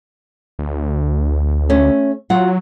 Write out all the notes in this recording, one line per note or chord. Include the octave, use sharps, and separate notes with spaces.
D2
A3 C#4
F#3 F4 F#5